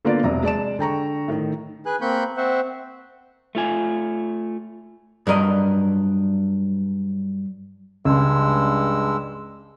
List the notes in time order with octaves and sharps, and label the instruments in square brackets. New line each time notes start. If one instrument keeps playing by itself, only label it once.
[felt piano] D3 A#3 B3 F4 D5
E1 C3 A#5
G#3 D5 A5 E7
D3 G5 A#5 C#6
A2 D#3
[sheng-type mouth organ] G#4 B4 G#5 F#6
A#3 C4 B5 C#6 F#6 G6
C4 C5 E5 F#5 C#6
[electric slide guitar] A3 F4 G#5
[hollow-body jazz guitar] G2 F#3 A#4 D#5
[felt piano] C#2 [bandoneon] G2 G#3 E6